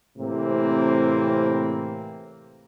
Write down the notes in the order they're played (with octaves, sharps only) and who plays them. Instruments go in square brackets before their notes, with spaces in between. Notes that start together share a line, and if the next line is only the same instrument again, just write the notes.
[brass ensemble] A2 C3 E3 A#3 C4